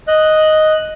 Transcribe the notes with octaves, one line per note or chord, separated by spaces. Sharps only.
D#5 F#6